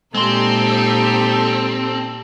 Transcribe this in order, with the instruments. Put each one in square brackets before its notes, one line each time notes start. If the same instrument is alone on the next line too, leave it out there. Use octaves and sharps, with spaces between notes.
[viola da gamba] A#2 D#4 G4 [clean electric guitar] G#3 C6 [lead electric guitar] C4 [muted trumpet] A4